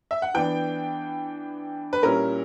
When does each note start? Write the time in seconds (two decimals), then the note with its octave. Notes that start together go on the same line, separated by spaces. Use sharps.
0.11 E5
0.22 F#5
0.34 E3 B3 D4 G5
1.93 B4
2.02 A#2 G3 C#4 E4 A#4